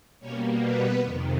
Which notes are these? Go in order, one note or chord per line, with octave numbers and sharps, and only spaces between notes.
B2 G3 A#3 C#4 C#5
B3 B4
F2 C3 D#3